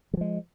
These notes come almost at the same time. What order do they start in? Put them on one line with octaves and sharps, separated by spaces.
F#3 F3 G#3